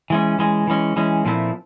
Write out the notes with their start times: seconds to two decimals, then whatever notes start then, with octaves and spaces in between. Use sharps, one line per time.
0.10 E3 G#3 C#4
0.39 E3 G#3 C#4
0.67 E3 G#3 C#4
0.96 E3 G#3 C#4
1.25 A#2 F3 A3 C4 E4